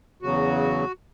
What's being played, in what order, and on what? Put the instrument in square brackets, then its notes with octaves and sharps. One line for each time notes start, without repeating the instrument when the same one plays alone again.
[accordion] E2 C#3 F#3 F#4